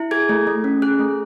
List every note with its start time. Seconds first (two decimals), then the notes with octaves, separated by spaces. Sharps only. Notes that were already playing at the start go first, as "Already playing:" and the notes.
Already playing: E4
0.11 G#4 G#6
0.29 A3
0.47 A3
0.64 C#4
0.82 G#4 F#6
0.99 A3